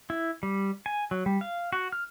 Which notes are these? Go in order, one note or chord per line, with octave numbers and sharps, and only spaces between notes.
E4
G3
G#5
F#3
G3
F5
F#4
F6